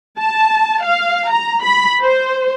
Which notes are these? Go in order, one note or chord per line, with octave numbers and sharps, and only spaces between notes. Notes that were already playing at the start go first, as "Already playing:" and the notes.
A5
F5
A#5
B5
C5